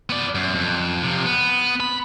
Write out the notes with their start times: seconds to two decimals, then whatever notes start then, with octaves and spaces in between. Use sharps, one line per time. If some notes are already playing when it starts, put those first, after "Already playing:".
0.10 B3 D5
0.35 F#2
0.55 F2
1.03 C3 F3
1.25 B3
1.80 B5